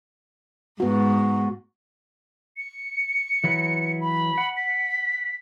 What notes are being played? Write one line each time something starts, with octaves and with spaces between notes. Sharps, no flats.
G#2 B3 F#4
C#7
E3 F#3 B4
B5
F#5
B6